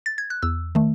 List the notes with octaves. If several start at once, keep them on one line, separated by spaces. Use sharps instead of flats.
A6
G#6
F#6
E2 E6
D#3 A3